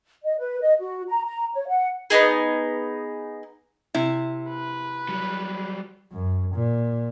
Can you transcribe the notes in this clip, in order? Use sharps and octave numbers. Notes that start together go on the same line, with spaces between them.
D#5
B4
D#5
F#4
A#5
A#5
C#5
F#5
B3 D4 D#4 G#4
C3 E4
B4
F#3 G3
F#2
A#2